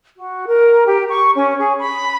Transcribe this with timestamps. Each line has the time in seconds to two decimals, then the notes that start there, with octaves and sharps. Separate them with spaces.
0.17 F#4
0.47 A#4
0.87 G4
1.10 C#6
1.36 C#4
1.59 G#4
1.79 B5